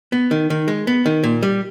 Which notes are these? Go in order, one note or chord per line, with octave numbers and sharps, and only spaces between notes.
B3
D#3
D#3
G#3
B3
D#3
A#2
G3